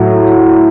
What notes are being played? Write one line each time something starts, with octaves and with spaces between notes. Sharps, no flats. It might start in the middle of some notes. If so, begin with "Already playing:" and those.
Already playing: A2 F#3